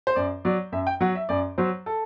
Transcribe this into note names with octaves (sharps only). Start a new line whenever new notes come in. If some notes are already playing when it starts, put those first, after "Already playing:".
C5
F#2 D5
F#3 D5
F#2 E5
G5
F#3 F#5
E5
F#2 D5
F#3 C5
A4